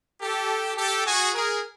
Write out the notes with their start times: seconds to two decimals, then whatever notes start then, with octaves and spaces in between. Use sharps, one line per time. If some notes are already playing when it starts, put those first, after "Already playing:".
0.21 G4 A4
0.77 G4 A4
1.05 F#4 G#4
1.33 G#4 A#4